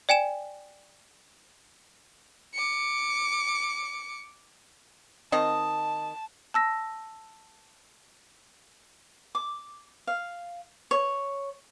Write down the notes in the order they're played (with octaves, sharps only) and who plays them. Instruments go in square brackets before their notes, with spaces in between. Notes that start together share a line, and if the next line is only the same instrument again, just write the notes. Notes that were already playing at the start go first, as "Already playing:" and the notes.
[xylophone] D5 G5 G#5 E7
[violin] D6 C#7
[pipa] D#3 C4 D#5 [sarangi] A5
[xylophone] A5 E6 A#6
[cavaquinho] D6
F5
C#5